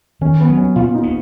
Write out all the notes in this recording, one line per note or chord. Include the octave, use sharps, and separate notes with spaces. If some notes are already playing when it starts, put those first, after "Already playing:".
D#3 C#4
B3
F#3
C#4
A#2 F4
D#4
C#4